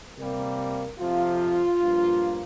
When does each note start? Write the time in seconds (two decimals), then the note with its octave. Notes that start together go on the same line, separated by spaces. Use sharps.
0.18 C3 G3 A#3 A#4
0.99 F2 C3 F3 F4
1.81 G2 F3 A#3